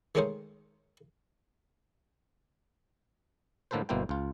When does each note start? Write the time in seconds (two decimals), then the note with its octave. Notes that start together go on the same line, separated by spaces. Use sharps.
0.15 D#3 G#3 A3 C#4 D#4 C5
3.71 A2 D3 A#3 A4 B4 C5
3.89 G1 B2 A#3 E4 C5 G5
4.09 C#2 F4